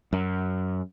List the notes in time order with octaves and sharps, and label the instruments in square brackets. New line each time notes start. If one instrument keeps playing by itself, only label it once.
[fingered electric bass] F#2